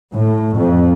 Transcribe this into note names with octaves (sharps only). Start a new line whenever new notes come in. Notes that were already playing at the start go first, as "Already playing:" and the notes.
A2
F2